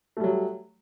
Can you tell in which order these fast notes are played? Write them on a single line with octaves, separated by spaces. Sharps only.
A3 G3 F#3